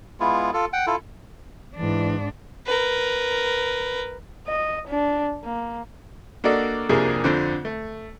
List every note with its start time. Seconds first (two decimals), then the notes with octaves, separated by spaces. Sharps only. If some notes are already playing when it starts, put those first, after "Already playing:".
0.20 G#3 B3 E4 F4
0.53 F4 A4
0.73 F#5 G5
0.87 E4 F4 A4
1.76 G#2 E3 D4
2.66 A#4 B4
4.47 D#5
4.87 D4
5.44 A#3
6.44 A#3 D4 F#4 A4 D5 D#5
6.89 C2 F2 A#3 D4 G4 G#4
7.24 F2 D3 C4 D4
7.65 A3